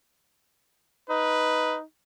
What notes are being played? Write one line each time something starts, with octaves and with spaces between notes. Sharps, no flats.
D#4 B4